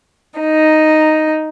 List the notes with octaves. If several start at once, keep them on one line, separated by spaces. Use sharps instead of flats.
D#4